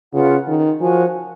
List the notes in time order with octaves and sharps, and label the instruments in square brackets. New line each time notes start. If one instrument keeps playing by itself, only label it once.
[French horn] C#3 [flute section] F4 B4 F#5
[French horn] D#3
[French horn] F3 [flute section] F#4 A#4 C#5 G#5